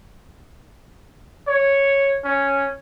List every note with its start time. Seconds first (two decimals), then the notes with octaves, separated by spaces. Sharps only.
1.48 C#5
2.25 C#4